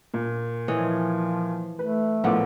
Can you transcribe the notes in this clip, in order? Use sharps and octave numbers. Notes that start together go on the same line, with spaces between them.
A#2
E3 F3 C#5 D#5
A3 B4
A#1 A2 F3 A#3 B3 D6